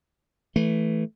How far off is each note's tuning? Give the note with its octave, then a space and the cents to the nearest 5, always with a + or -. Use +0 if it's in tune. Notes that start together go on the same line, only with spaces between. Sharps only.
E3 +0 A3 +0